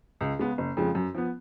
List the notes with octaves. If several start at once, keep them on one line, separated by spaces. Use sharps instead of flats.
C#2
C#3 G#3 B3
F#1
F2 C#3 F3 G#3
F#2
F3 B3